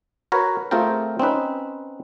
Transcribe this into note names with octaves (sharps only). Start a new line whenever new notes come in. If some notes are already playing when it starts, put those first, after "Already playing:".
F#4 A#4 B4 C#5
A3 C4 F4 G#4 A#4 G5
C4 C#4 D#4 B4